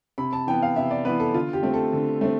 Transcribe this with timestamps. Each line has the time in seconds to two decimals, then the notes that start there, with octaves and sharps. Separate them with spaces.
0.18 C3 B5
0.33 A5
0.47 E3 B3 G5
0.62 F5
0.76 C3 E5
0.91 D5
1.05 E3 B3 B4
1.20 A4
1.34 D3 F4
1.53 G4
1.63 A3 C4
1.74 A4
1.93 D3
2.21 A3 C4